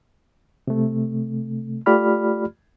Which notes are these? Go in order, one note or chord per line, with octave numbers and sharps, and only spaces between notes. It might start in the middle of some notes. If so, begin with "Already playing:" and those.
C3 A3
A3 F4 G4 D5 B5 F6